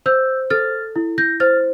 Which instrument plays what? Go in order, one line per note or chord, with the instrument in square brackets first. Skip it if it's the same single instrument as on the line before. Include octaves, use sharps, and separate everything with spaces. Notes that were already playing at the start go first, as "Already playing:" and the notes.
[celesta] C5 E6 G6
A4 F6 A6
E4
G6 A#6
C5 F6 A6